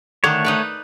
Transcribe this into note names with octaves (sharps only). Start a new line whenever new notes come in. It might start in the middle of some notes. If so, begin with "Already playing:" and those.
D3 D#3 A3 D4 C#5
D#4 B4 D5